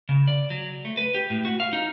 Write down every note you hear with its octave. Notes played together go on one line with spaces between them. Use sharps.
C#3
D5
F#3
A3
B4
G4
A2
F#4
F5
D#4